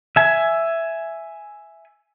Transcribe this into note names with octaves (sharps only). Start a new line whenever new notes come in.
E5 G#5